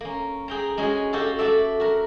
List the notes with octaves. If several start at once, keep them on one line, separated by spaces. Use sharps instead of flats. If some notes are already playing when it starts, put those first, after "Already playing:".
A#3 C#4
G#4 G5 A#5
G#3 C#4 F#4 G#4
F#4 G4 A4 F5
F#4 A4 D5 E5
F#4 A#4